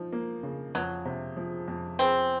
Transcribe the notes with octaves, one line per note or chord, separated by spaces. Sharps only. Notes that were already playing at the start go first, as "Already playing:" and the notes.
Already playing: F3 D#4
A#3
C#3
F2 F#3
C3
F3
F2
C4 G#4